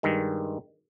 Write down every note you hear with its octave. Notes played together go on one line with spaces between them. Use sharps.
G2 D#3 G#3